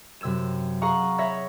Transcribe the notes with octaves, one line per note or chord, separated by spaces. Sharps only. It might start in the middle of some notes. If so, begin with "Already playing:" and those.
F#2 C3 E6 G#6 E7
G#4 F5 F#5 A#5 C#6
C#5 E5 B5 A#6